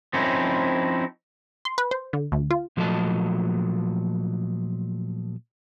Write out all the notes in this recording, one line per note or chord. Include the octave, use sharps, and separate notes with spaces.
F3 C4 C#4 D#4 E4
C6
B4
C5
D3
D2
F4
A#2 F3 F#3 A3 D#5 A5